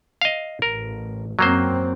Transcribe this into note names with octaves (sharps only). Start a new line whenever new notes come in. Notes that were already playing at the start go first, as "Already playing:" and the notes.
D#5 F5
A1 A#4
F#2 F#3 A#3 C4 C5